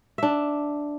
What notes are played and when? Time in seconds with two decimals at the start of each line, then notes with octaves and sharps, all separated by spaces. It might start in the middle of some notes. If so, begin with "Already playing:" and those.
0.18 D4 E5